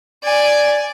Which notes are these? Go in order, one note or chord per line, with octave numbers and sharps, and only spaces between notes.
D5 G#5